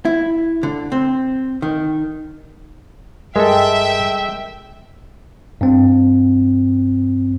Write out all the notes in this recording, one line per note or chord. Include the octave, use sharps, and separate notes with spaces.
E4
D3
C4
D#3
G2 G3 G#3 A4 A#4 E5 G5
G2 C4